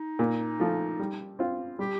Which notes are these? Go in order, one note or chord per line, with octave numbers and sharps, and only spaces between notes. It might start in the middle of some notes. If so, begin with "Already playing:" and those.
Already playing: D#4
A#2
F3 A3
G3
C4 F4
G3 G4